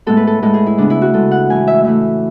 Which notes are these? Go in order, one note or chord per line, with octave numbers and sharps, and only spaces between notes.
A2 G#3 B3 A4
B4
A4
A2 G#3 B3 A4
G#4
E4
C#3 G#3 B3 D4
E4
F#4
C#3 G#3 B3 A4
F#5
A2 E3 A3 G#5
E5
A2 E3 A3 E5